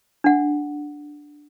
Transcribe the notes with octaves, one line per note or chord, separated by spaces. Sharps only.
D4 F#5